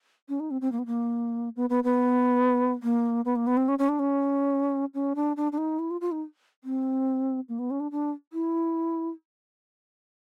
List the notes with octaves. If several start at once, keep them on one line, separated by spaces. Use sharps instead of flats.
C#4
D#4
C4
C4
A#3
B3
A#3
B3
B3
B3
A#3
B3
A#3
B3
C4
C#4
C#4
D4
C#4
C#4
D4
D4
D4
D#4
E4
F4
F4
D#4
C4
A#3
B3
C#4
D4
D4
E4